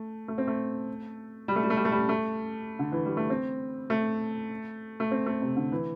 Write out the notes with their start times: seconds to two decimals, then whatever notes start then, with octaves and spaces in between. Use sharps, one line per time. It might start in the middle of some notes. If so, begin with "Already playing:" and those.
Already playing: A3
0.28 A3
0.38 C4
0.47 A3
1.48 G3
1.56 A3
1.64 G3
1.70 A3
1.77 G3
1.85 A3
1.92 G3
2.09 A3
2.79 D3
2.92 E3
3.05 G3
3.17 A3
3.30 C4
3.90 A3
5.00 A3
5.11 C4
5.26 A3
5.42 C3
5.56 D3
5.72 E3